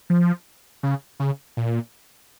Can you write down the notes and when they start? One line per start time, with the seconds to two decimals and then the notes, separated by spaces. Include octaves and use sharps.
0.10 F3
0.83 C#3
1.20 C#3
1.57 A#2